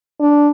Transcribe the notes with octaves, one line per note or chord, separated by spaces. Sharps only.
D4